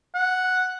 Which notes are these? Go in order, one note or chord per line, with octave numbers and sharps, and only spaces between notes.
F#5